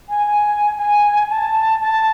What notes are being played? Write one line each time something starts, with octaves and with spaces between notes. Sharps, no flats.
G#5
G#5
G#5
A5
A5